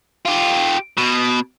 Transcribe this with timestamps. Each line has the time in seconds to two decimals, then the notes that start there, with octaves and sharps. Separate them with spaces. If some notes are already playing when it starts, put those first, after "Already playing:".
0.25 F4 G4
0.98 B2